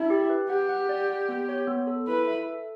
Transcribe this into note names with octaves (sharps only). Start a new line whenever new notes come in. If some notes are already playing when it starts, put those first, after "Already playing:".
Already playing: D4 E4
G4
B4
G4 F#5
F#5
D5
F#5
B3
C#5
B3
A4
E4 B4
E5
A4